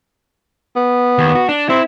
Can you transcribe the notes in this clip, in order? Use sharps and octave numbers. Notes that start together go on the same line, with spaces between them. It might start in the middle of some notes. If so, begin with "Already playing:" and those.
B3
D#2
F#4
D4
C4 E4